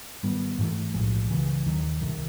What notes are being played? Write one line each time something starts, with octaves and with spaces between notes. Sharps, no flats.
G#2 D#3 G3 B3
G#2 E3 A3
B1 A2 F3 G#3
C#2 C#3 E3
D#2 D#3 F#3
C2 C3 D#3